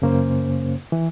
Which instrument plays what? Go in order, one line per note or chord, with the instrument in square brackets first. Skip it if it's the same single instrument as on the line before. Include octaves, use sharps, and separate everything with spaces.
[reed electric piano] F#2 C#3 A#3 C#4 C5
E3